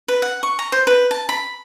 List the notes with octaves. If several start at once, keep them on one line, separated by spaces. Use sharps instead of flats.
B4
F#5
C#6
A#5
C5
B4
A5
B5